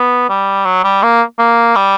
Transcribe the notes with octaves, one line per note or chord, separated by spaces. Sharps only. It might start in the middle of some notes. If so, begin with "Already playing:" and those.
Already playing: B3
G3
F#3
G3
A#3
A#3
G3